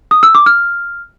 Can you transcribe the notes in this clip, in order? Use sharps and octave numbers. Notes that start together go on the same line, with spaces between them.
D#6
E6
D6
F6